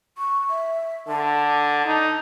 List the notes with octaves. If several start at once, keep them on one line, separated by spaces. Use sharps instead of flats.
C#6
E5
D3 A5
D#4